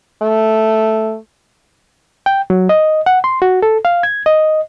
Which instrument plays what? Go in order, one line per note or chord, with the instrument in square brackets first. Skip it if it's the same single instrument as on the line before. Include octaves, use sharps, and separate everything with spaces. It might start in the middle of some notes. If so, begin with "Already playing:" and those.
[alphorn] A3
[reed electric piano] G5
F#3
D#5
F#5
C6
F#4
A4
F5
G#6
D#5